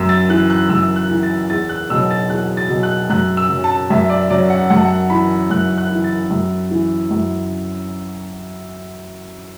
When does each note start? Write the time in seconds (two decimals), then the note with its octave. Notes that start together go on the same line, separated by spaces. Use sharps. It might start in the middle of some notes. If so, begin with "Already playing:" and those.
Already playing: F#2 E6
0.09 A6
0.29 E3 F#6
0.50 F#6
0.69 F#2 E6
0.96 F#6
1.10 E3
1.23 A6
1.50 E2 A6
1.69 F#6
1.90 B2 F#3 E6
2.10 A6
2.30 E2 F#6
2.57 A6
2.70 B2 F#3
2.83 F#6
3.10 F#2 F#6
3.37 E6
3.50 F#3
3.64 A5
3.90 F#2 E5
4.10 D5
4.30 F#3 D5
4.50 F#5
4.70 F#2 F#5
4.77 A5
4.85 F#5
5.10 E3 B5
5.50 F#2 F#6
5.78 F#6
5.91 E3
6.04 A6
6.31 F#2
6.71 E3
7.11 F#2